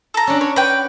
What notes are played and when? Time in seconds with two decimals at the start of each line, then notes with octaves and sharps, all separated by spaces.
0.14 A4 A#5
0.27 C#4 D4
0.41 C#5
0.56 F#4 B4 G5